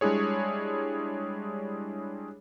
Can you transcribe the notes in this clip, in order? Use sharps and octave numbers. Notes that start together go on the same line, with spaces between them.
G3 G#3 D4 E4 G#4 C#5